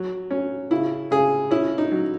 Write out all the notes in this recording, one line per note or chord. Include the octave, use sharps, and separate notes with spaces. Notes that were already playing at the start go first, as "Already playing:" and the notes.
Already playing: F#3
C#4
C#3 E4
C#3 G#4
C#4 E4
D#4
F#3